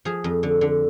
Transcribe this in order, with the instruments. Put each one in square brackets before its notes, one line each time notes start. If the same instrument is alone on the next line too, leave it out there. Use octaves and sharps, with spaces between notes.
[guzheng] F3 G#4
F2
D3
D3